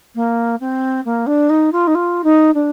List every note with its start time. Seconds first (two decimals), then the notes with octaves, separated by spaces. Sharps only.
0.15 A#3
0.60 C4
1.05 A#3
1.26 D4
1.49 D#4
1.72 F4
1.87 D#4
1.95 F4
2.24 D#4
2.54 D4